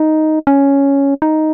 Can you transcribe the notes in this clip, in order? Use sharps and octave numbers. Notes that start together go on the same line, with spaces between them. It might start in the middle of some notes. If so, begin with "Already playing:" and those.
Already playing: D#4
C#4
D#4